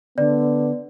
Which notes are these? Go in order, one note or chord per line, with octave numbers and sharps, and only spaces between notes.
D3 B3 D5